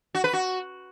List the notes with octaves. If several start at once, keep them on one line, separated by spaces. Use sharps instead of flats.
F#4
B4
F#4